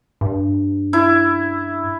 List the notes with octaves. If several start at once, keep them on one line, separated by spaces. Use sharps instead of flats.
G2
E4